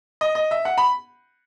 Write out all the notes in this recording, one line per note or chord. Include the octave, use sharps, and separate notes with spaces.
D#5
D#5
E5
F#5
B5